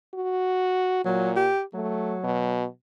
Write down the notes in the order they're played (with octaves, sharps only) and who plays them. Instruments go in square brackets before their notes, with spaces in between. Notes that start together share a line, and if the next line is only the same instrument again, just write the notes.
[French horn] F#4
[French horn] A#2 [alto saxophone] F#3
[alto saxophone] G4
[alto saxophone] F#3 [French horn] A3
[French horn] B2